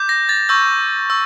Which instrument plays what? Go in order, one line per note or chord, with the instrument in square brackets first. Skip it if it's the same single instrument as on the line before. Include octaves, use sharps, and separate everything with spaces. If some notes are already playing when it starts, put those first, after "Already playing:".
Already playing: [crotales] D6 G6
A#6
A6
C#6 E6 G6
C#6 E6